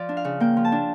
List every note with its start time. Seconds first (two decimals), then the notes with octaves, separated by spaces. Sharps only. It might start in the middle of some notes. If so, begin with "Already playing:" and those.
Already playing: F3 D5
0.09 D4
0.17 F5
0.25 C#3
0.40 A#3 G5
0.57 F3
0.65 A5
0.72 D4